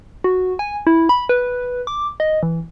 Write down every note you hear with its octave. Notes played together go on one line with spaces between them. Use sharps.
F#4
G#5
E4
B5
B4
D6
D#5
E3